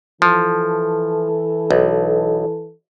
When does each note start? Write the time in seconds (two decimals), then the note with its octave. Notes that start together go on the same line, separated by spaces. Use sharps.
0.22 E3 F3 A4
1.71 B1